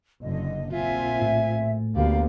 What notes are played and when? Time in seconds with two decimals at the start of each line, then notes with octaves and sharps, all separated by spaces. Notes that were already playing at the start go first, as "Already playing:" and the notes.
0.22 F#1 D3 D#5
0.72 A#1 A#2 C4 F4 E5 G#5
1.22 A2
1.96 D2 A#3 B3 G4 D5 F5